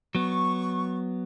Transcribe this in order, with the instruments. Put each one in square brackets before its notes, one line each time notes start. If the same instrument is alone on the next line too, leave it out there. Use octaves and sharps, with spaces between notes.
[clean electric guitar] F#3 B3 [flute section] C#6